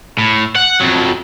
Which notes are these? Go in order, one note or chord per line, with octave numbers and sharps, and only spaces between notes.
A2
F#5
F2 F#3